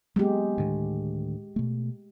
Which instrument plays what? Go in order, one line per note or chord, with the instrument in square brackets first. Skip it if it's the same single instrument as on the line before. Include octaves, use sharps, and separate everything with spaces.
[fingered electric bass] F#3 A#3 B3 [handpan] G#3 G4
[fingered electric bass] D2 A2 D#3
B2 A3